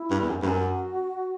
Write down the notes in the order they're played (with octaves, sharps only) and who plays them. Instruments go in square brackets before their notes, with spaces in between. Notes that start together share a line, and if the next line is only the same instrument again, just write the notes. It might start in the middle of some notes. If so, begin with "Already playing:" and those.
Already playing: [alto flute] E4
[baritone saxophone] G2
E2
F#2
G2
[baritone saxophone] F#2 [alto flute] F#4